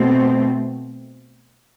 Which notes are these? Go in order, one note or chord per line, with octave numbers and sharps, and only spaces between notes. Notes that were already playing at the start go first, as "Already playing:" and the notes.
Already playing: B2 A3 C4